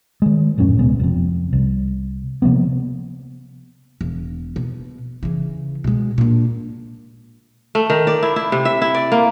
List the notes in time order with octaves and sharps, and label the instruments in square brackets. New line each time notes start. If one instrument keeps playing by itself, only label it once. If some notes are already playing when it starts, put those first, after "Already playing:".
[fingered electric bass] D#3 G#3
D#1 F#2 A2 C#4
C#2 B2 G#3 B3
F1 F2
C2
C3 F3 A#3 B3
[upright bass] E1
B2
C#3 E3
B2 G#3
A#2 D4
[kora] A3
D#3
D5
E4
E4
C3
E5
E4
D5
A#3